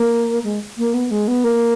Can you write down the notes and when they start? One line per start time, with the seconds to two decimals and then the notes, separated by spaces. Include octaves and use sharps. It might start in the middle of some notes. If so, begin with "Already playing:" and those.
Already playing: A#3
0.44 G#3
0.78 A#3
0.94 B3
1.11 G#3
1.28 B3
1.44 A#3